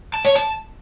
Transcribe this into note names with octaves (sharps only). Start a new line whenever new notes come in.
A5
C#5
A5